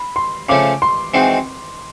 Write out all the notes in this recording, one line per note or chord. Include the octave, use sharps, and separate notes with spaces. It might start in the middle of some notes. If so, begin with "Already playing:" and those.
Already playing: B5
C6
C#3 F3 A3 C#4 D6
C6
E3 G#3 C4 D#4 F#4